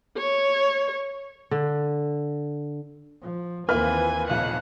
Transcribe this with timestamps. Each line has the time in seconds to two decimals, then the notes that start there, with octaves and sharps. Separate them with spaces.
0.17 C#5
1.51 D3
3.22 F3
3.69 D#2 E3 A#3 C4 F4 B4 G#5 F6
4.28 F1 B1 F2 A#2 C#3 F#5